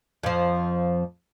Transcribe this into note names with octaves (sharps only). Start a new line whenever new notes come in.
F2 F3